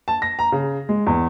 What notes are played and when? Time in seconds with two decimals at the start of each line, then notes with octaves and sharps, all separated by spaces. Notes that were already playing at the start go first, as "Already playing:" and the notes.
0.08 A5
0.22 A#6
0.39 A#5
0.52 C#3
0.89 G#3
1.07 E2